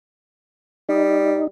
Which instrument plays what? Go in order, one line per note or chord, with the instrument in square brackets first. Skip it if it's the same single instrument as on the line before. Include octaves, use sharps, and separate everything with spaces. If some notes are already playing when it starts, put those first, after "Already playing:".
[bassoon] G3 [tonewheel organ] D#4